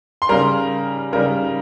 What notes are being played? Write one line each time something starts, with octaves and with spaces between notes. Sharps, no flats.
C6
C#3 G3 A#4 A#5
C#3 G3 A#4 A#5